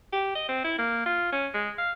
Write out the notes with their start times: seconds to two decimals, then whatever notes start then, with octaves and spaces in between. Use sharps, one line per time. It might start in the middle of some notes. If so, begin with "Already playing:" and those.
0.12 G4
0.35 D#5
0.48 C4
0.64 E4
0.78 A#3
1.06 F4
1.32 C#4
1.54 G#3
1.78 F5